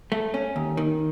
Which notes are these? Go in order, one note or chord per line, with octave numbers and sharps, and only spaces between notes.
A3
C#4
D#2
D#3